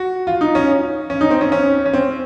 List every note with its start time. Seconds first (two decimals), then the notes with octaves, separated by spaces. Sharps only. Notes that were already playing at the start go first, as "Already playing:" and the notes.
Already playing: F#4
0.27 F4
0.41 D#4
0.55 C#4
1.10 C#4
1.21 D#4
1.31 C4
1.41 C#4
1.52 C#4
1.86 C#4
1.93 C4